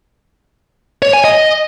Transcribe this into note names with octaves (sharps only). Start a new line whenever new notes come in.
C#5
G#5
D#5